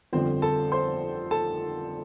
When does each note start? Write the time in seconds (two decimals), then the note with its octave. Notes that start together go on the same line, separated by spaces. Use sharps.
0.13 G1 F2 D3 F3 C4 C5
0.42 A4 A5
0.72 C5 C6
1.31 A4 A5